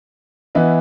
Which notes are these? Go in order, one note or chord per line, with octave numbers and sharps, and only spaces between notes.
E3 B3 E4 B4 D#5